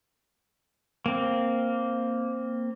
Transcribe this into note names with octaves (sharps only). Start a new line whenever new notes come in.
A#3 C4